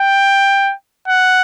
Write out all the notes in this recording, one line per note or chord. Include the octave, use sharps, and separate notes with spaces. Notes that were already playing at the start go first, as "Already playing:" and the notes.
Already playing: G5
F#5